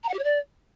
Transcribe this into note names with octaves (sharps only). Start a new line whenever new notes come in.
A#5
F#5
G4
C#5
D5